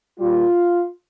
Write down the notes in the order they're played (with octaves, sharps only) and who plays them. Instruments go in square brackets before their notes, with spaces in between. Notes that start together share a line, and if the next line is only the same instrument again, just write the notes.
[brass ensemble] A#2 G3 F4